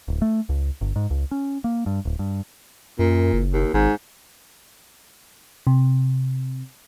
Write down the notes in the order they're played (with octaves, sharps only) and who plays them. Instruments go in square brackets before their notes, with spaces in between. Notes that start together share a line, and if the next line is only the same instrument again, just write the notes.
[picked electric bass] D1
A3
C#2
G1
G#2
C#2
C#4
A#3
G2
D1
G2
[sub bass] F#2 [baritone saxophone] A#2
[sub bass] F#1
[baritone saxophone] D#2
[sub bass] G#1 [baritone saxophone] G#2
[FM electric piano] C3